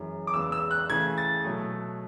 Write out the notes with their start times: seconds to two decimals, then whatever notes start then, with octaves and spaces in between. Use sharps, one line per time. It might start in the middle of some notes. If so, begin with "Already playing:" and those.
Already playing: F#2 E3 G#3
0.27 D6
0.34 E2 C#3 G#3 B3 E6
0.52 E6
0.71 F#6
0.90 C#3 E3 A3 G#6
1.18 A6
1.45 B2 F#3 A3